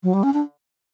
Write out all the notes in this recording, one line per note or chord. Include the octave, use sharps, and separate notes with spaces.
F#3
G3
C#4
D4